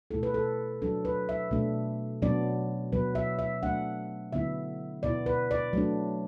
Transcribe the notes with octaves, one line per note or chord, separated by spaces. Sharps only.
B2 A3 E4 A4
B4
A4
F#3 D4 A4
B4
E5
B2 A3 D4
B2 F#3 B3 D4 D5
B2 F#3 B3 B4
E5
E5
F#3 A3 D4 F#5
D3 F#3 B3 E4 E5
B2 B3 E4 D5
B4
D5
F#3 A3 D4